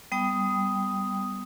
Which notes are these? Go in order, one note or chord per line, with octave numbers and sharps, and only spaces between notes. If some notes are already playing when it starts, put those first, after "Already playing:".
G3 B3 G5 D#6